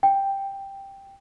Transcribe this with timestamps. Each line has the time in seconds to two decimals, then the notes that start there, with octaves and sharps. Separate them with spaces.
0.03 G5